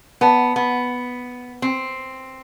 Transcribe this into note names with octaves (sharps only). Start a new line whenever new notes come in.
B3 B4 D5 A5
B3
C4